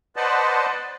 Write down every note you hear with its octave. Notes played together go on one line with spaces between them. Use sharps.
B4 C5 D5 D#5 F#5 A5